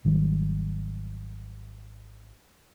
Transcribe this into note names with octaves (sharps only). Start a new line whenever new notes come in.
G#1 D#3 F#3 G3